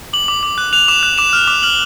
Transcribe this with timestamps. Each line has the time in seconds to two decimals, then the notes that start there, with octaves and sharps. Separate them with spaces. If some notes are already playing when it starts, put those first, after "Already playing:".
0.13 D6 F#7
0.28 D6
0.43 D6
0.58 F#6
0.73 F#6 F7
0.88 D6 E7
1.03 F#6
1.18 D6 E7
1.33 F6
1.48 D6
1.63 F6 F#7